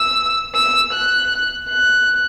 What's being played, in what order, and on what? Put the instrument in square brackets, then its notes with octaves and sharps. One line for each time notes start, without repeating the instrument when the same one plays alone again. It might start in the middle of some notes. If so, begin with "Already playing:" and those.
Already playing: [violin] E6
E6
F#6
F#6